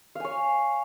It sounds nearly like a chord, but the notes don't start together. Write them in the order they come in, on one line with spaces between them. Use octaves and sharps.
F5 G#5 C#5